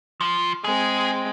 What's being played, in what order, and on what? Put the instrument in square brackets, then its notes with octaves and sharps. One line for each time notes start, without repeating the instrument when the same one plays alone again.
[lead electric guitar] F3
[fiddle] G#3 C4 [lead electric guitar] G#4